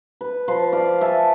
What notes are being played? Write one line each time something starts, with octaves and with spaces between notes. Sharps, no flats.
B4
F3 B4 C6
D5 F5
E5 G#5 A5